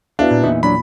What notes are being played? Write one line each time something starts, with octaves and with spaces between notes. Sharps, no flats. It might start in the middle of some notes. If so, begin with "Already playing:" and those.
B3 D4 E4 F#4 F5
A#2
E2 A#2 B3 D#4 E5
F#3 D4 B5